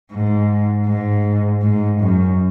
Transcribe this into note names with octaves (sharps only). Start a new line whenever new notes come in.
G#2
G#2
G#2
F#2